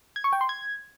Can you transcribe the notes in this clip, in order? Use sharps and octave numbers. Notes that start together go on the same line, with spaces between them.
G#6
C#6
G5
C6
G#6